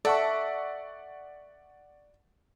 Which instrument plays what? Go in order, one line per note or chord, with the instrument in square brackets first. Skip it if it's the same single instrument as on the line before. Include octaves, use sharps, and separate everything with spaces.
[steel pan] A4 [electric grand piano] D5 F#5 C#6 [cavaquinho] E5